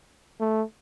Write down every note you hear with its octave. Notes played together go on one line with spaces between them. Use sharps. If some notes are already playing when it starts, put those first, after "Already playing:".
A3